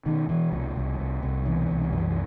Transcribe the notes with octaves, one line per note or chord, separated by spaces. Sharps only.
B2 D#3
B2 E3
C2 F3
C2
C2
C2
B2 E3
C2
F#2 E3